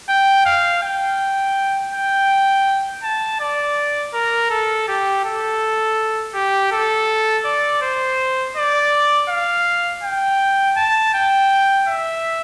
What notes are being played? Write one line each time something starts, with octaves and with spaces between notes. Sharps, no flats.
G5
F5
G5
G5
A5
D5
A#4
A4
G4
A4
G4
A4
D5
C5
D5
F5
G5
A5
G5
E5